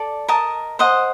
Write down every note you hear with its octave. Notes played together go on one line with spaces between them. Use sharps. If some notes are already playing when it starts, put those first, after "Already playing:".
Already playing: A4 D5 A5 D6
A#4 D#5 A5
C5 D#5 F#5